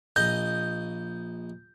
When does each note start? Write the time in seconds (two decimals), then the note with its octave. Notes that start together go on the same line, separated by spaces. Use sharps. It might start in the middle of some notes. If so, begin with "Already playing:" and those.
0.16 A#1 D#5 G6